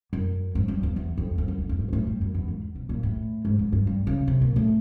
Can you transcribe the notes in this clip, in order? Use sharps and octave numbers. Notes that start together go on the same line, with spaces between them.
F#2
G#2
G2
E2
E2
F2
F2
F#2
F2
G2
A2
A#2
A2
G2
F#2
E2
G#2
B2
A#2
A2
G#2
G#2
G2
G2
C#3
C3
A#2
A2